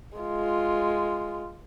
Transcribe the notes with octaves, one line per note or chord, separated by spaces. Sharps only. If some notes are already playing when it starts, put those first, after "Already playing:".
G#3 F4